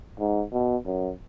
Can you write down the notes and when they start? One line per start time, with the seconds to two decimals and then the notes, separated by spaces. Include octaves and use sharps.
0.19 G#2
0.53 B2
0.86 F#2